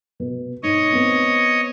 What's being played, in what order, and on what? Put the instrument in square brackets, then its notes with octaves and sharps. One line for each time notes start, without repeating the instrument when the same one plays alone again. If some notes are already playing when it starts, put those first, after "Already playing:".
[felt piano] B2
[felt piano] G#2 [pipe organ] C#5 D#5
[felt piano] B3 C4